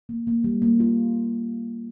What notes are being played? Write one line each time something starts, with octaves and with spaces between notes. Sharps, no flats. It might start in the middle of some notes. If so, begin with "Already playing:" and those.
A#3
A#3
G3
A#3
F4